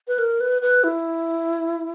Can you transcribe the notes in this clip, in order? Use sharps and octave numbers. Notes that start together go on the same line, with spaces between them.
B4
A#4
B4
B4
E4